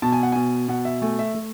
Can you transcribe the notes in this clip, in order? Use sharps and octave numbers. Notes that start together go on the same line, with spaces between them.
B2 A5
G#5
F#5
B2 G#5
B2 F#5
E5
A3 G#5
E5
A3